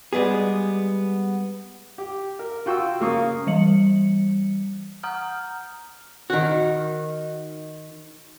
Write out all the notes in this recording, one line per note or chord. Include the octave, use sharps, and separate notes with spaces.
G3 G#3 B3 G#4
G4
A#4
F4 F#4 G5 C#6 E6
C#3 A#3 C#6 D#6
E3 G3 C#7 F#7
F#5 A#5 D#6 F6 G6
D#3 F#4